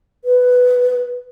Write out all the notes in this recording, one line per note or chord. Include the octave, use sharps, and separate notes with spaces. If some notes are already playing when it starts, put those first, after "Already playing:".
B4